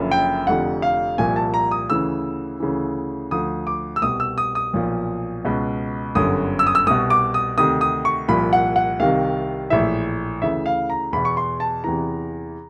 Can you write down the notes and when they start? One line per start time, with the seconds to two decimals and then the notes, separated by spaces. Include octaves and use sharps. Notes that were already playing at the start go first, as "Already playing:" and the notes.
Already playing: F#1 F#2 D3 F3
0.11 G5
0.47 F1 F2 D3 F3 F#5
0.82 F5
1.18 C2 A#2 F3 G#5
1.36 A5
1.54 A#5
1.71 D#6
1.89 D2 C#3 E3 E6
2.60 D2 C#3 E3
3.31 D2 D3 F3 D#6
3.67 D6
3.96 E6
4.02 C2 B2 D#6
4.20 E6
4.38 D#6
4.55 D#6
4.73 B1 A#2 F3
5.45 C#2 B2
6.15 G1 F#2 D3 D#6
6.59 E6
6.67 D#6
6.75 E6
6.87 C2 B2 D#6
7.10 D6
7.34 D#6
7.57 D2 C3 D#3 D#6
7.81 D#6
8.05 C#6
8.28 C2 A#2 F3 B5
8.53 F#5
8.76 F#5
9.00 C2 C3 D#3 F5
9.70 A#1 A2 E3 E5
10.42 D2 C#3 E3 E5
10.66 F5
10.90 A#5
11.13 E2 B2 B5
11.25 C#6
11.37 C6
11.60 A5
11.84 E2 C3 E3 A#5